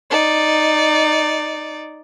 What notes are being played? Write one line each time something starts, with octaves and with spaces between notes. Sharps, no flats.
D#4 D5